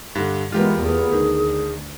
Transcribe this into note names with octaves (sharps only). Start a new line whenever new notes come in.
G2 D3
E3 G#3 B3 F4 G4 A#4
E2 B3 G#4
D2 D#3